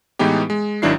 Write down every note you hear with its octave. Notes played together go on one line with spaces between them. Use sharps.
A2 E3 G#3 B3 D#4 G4
G#3
G#1 D#3 F#3 D4 E4 C7